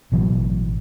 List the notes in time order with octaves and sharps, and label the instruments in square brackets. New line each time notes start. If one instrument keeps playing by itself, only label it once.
[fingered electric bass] A1 B2 E3 F#3